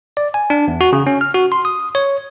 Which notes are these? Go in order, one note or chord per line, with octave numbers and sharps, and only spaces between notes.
D5
G#5
D4
E2
F#4
C#3
C#4
F6
F#4
C6
D#6
C#5